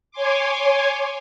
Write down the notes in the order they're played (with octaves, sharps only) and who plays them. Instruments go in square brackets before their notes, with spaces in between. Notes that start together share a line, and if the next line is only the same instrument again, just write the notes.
[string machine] C#5 G#5 C6 D6